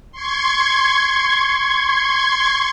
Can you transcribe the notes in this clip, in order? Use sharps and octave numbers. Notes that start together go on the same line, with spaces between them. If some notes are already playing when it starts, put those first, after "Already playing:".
C6 C#6 G#6